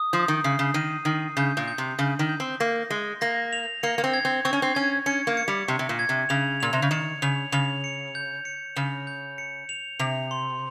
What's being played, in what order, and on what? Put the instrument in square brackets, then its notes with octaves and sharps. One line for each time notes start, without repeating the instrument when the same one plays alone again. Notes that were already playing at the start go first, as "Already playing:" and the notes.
Already playing: [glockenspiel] D#6
[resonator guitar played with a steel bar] F3 [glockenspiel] G6
[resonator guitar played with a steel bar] D#3
[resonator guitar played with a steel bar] C#3 [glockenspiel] C7
[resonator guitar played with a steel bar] C#3
[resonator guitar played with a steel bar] D#3 [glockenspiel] D#7
[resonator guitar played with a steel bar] D#3 [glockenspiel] C7
[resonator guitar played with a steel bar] C#3 [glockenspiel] G6
[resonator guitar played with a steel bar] A#2
[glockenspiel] G6
[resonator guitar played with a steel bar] C3
[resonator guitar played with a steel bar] C#3 [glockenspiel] G6
[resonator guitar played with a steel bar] D#3
[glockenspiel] G6
[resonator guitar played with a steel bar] C4
[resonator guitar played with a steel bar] A#3 [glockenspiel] A#6
[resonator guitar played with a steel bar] G#3 [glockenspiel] A#6
[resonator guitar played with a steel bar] A#3 [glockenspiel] A#6
[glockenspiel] F7
[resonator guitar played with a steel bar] A#3 [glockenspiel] C#7
[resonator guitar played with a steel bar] A#3
C4
[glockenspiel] G#6
[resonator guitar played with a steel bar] C4
[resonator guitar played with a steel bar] C4 [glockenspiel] C#6
[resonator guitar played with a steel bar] C#4
C4
[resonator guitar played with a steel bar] C#4 [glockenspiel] G#6
[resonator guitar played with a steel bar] C#4 [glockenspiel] C#7
[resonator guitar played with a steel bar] A#3
[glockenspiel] C#7
[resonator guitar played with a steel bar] G3
[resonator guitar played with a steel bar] C3 [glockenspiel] C#6
[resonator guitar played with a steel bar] C3
A#2
[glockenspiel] G#6
[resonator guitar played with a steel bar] C3
[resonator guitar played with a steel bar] C#3 [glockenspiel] F7
[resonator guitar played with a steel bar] A#2 [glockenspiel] F7
[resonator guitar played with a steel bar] C3
C#3
[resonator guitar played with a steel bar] D#3 [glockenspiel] C#7
[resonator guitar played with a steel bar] C#3 [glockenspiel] F7
[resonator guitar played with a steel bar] C#3 [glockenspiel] F7
[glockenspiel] C#7
G6
C#7
[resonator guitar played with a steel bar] C#3 [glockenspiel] F7
[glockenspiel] G6
C#7
F7
[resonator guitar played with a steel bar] C3 [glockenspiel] F7
[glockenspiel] C6